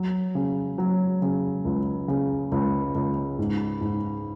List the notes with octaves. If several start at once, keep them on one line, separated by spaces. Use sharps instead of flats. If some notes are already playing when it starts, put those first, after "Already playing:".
Already playing: F#3
C#3
F#3
C#3
C#2
C#3
C#2
C#2
G#2
G#2